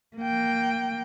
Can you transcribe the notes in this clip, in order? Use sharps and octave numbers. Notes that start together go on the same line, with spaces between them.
A#3 G5